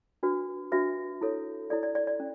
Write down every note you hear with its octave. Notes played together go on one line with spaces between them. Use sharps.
D4 F#4 B4
D4 F#4 B4 E5
E4 A4 C#5
E4 A4 C#5 D5
D5
D5
D5
C#4